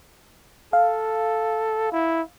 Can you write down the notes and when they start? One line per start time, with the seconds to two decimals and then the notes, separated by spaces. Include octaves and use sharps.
0.73 A4 F5
1.92 E4